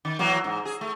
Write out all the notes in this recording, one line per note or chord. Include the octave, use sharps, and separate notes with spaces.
D#3
E3 F#3 A#3
G#2
G#4
A3